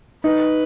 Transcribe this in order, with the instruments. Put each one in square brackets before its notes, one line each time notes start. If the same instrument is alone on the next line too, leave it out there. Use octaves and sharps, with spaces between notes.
[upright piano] D#4 [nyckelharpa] B4